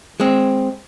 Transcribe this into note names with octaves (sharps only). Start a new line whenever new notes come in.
G#3 C4